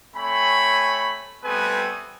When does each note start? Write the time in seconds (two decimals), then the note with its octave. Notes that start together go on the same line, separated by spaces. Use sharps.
0.16 A3 C4 C#5 G#5 B5
1.44 G3 A3 B3 C4 B4 G#5